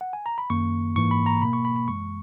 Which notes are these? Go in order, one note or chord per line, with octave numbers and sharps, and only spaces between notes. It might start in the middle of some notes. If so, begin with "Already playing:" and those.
F#5
G#5
A#5
B5
F#2 D#3 A#3 C#6
G#2 E3 A#3 C#6
B5
A#5
B2 A#3 B5
C#6
B5
B5
F#2 E3 G#3 C#6